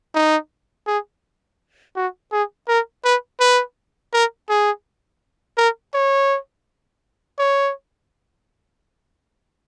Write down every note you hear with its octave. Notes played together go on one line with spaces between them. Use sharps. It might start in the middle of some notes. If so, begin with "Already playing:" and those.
D#4
G#4
F#4
G#4
A#4
B4
B4
A#4
G#4
A#4
C#5
C#5